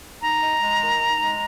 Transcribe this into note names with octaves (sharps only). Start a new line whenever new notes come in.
D#4 A#5
G#3
G#3
D#3
D#4
G#3